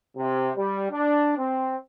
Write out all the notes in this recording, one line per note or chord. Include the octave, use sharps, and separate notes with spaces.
C3
G3
D4
C4